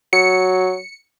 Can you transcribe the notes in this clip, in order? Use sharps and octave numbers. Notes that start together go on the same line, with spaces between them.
F#3 C#7